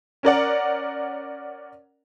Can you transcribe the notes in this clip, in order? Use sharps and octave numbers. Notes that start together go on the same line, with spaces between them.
C#4 A#4 D5 F#5